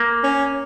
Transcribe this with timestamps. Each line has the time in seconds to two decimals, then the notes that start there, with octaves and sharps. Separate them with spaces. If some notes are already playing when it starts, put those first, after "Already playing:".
Already playing: A#3
0.24 C#4